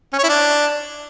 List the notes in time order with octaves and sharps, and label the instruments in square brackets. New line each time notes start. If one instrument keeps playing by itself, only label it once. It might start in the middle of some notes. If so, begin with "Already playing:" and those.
[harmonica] C#4
C#5
E4
D4